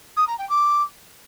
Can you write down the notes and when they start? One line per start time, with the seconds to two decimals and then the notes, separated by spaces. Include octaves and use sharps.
0.16 D#6
0.27 A#5
0.38 G5
0.49 D6